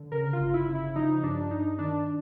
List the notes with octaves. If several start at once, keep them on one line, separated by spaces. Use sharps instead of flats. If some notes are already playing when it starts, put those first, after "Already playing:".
Already playing: D3
C#3 A#4
F4
G1
E4
C#3
E4
F3 D#4
G2 D4
G2 D#4
D#3 D4